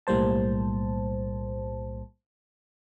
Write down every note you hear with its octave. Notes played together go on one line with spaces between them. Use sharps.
B1 A2 G3 A#3 C5 A5